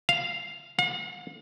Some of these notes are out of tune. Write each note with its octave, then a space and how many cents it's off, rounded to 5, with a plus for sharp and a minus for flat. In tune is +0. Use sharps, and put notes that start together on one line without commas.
F5 -5
F5 +45